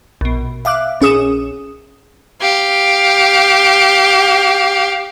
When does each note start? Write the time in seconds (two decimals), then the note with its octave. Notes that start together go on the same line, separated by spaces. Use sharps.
0.21 A#1 B2
0.65 E5 F5 D6 F#6
1.01 A#1 C#4 G#4 D#6 E7
2.42 G4 F5